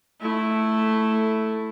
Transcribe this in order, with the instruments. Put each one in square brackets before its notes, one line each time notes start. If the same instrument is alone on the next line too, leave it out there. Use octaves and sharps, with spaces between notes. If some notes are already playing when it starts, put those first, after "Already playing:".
[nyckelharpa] A3 E4